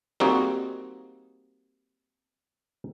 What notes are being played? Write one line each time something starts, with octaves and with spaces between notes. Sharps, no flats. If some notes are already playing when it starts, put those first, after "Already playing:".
G3 A#3 C4 D#4 F#4 G#4